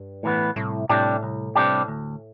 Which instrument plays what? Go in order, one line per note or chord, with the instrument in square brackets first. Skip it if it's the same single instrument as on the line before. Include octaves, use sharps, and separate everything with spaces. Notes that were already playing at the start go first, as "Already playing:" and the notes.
Already playing: [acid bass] G2
[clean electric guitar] A2 E3 B3
[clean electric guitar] C2 [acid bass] A2
[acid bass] A2 [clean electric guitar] C3 G3 D4 G4
[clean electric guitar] C2
C3 G3 D4 G4
D2